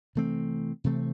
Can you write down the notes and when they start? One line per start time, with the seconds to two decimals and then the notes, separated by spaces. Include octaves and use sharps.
0.15 C3 E3 A3 C4
0.84 C3 E3 A3 C4